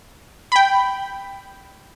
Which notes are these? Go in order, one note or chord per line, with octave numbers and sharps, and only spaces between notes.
G5 B5